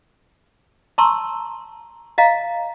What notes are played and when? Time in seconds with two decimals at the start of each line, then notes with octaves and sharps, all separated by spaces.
0.98 A5 A#5 C6 C#6 E6
2.18 D#5 F5 A#5